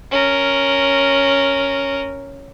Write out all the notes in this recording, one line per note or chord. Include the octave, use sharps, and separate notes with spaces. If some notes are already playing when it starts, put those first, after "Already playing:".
C#4 A#4